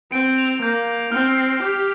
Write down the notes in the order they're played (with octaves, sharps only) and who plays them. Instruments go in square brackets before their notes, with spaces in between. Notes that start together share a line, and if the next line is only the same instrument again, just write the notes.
[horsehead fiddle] C4 [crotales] D7
[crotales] F7
[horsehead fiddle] A#3 [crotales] G6
[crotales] G6
[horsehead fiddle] C4 [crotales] F6
[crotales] C7
[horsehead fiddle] G4 [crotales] D6